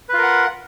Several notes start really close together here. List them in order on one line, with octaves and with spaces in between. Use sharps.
B4 F4 A#4 F#5